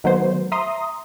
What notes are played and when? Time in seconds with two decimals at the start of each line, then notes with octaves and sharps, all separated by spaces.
0.04 D#3 F#3 A3 B3 C5
0.52 E5 A#5 C6 D#6